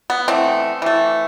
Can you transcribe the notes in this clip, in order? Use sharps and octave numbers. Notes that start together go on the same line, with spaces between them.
B3
E3 A3 C4
E3 A3